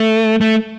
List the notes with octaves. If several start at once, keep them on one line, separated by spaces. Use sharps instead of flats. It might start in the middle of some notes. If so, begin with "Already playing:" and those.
Already playing: A3
A3